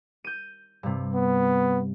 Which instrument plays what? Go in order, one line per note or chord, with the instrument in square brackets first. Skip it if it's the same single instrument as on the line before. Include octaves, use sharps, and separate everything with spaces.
[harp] G6 D#7
G2 C3
[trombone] B3